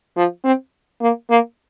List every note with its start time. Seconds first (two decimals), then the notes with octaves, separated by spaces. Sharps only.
0.17 F3
0.44 C4
1.01 A#3
1.30 A#3